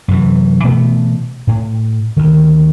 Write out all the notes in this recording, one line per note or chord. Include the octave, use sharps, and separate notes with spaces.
F#2 C3 E3
B2 E3 A3 B3
A2
D2 D#3